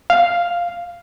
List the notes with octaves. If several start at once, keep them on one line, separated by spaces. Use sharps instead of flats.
F5